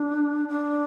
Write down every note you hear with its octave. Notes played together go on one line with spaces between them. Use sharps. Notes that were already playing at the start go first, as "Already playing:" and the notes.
Already playing: D4
D4